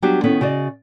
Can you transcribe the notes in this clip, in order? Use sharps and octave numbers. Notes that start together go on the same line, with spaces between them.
F#3 G3 B3 D4 F#4 G4
D#3 B3 C#4 E4 A4
C#3 F#4 D5 D#5